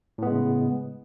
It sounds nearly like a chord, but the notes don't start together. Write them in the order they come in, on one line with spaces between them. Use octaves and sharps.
A2 B3 G#3 C#3